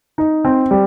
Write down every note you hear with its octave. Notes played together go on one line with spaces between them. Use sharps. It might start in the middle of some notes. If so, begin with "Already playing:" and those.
D#4
C4
G3